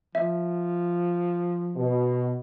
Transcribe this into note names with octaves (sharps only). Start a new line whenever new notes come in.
F3 E5
B2